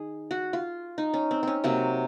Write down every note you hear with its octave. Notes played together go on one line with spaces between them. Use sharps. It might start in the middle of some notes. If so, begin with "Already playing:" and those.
Already playing: D#3 G#4
F#4
F4
D#4
C#4
C4
C4 C#4
C3 F#3 A#3 C4